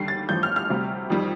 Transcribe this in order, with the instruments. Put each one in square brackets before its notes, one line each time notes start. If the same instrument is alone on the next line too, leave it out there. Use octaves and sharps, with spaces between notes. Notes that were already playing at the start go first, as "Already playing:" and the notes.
Already playing: [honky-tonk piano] D#2 D3 G3 C7
A6
A1 G2 F3 G6
F6
F6
D2 C3 G3
F2 D#3 G3